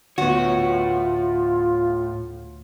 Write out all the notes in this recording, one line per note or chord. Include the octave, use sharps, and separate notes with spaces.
D2 A2 B3 F4 F#4 C#5